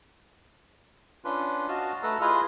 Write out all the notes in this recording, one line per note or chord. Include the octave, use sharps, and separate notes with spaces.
C#4 D4 F4 B4
F#4 D#5 F5 A5
A3 A4 B4 A#5 E6
E4 F4 G#4 B4 D#5 F5